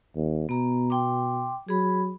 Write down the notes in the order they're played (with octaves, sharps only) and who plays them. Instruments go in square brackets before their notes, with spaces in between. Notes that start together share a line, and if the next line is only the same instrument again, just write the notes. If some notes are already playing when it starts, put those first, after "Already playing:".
[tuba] D#2
[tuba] B2 [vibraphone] B3 A#5
[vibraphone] G5 C6 D6
[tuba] F#3 [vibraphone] G#4 B5